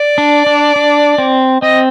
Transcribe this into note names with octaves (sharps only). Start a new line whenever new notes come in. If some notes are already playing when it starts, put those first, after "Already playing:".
Already playing: D5
D4
D4
D4
C4
C4 D#5